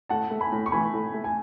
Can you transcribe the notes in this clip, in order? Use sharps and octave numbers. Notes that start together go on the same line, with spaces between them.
A2 F#5 A5
A3
G#5 B5
A2
C#6
E3 G#5 B5
A2
A3
G#5